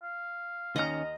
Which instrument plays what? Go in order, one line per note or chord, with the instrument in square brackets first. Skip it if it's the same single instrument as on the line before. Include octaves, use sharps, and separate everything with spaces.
[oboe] F5
[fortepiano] D#2 F6 [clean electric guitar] D#3 C#4 [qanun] D#5 A#5